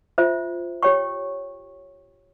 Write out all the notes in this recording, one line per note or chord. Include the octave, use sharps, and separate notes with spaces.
F4 C5 E5
G4 C#5 G5 C#6